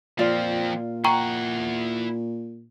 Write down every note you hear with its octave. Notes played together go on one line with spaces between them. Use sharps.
A#2 F3 C4 F4 D5 F5
E4 F#5 G5 A#5 C#6